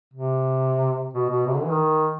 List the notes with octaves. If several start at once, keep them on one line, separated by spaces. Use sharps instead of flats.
C3
B2
B2
C3
D3
E3
D#3